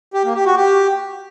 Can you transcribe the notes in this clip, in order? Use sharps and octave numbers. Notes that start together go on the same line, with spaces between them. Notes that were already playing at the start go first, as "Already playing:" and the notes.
G4
A#3
G4
F#4
G4